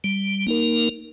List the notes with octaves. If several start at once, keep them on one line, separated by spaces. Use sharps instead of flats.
G3
A#3 D#4 A#4